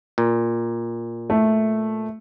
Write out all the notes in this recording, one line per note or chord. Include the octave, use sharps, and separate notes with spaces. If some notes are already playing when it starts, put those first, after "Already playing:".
A#2
A3